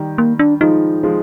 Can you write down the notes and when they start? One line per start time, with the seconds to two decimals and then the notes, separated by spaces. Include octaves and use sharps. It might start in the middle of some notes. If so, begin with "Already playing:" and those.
Already playing: D#3 G3
0.18 A#3
0.39 D4
0.61 F3 G#3 D#4
1.03 F3 G#3